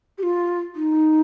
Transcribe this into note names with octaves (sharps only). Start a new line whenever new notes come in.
G4
F4
D#4